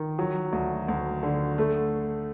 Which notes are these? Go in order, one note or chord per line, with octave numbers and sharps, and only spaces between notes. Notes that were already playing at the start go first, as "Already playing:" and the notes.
Already playing: D#3
F#3
D2
D2
D3
A3